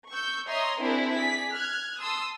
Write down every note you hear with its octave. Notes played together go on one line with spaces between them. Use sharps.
C#6 E6 G6
C#5 D#5 E5 A#5 C6 D#6
C4 D4 E4 G#4 A#4 C5
G#4 D5 B6
F6 F#6 G#6
A5 C6 D#6 E6